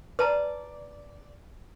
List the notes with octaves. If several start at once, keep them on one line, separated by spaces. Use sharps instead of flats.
B4 D5 A5 A#5